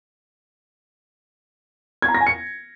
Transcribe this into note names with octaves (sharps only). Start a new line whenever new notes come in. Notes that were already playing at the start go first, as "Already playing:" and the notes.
G#6
A#5
A#6
G#5
C#7